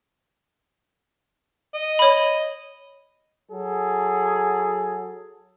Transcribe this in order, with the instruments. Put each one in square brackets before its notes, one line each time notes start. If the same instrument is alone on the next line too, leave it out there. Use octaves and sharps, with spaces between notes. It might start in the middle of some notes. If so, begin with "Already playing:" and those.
[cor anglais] D#5
[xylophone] C#5 B5
[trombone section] F#3 G#4 A4